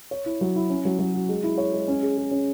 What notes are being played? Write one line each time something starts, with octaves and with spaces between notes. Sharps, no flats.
C#5
E4
F#3
E4
C#4
F#3
F#3
F#4
G#3
E4
C#5
G#3
C#4
G#4
G#4
C#4